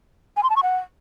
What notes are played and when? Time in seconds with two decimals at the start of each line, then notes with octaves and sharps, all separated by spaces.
0.37 G#5
0.43 C6
0.50 A5
0.56 C#6
0.63 F#5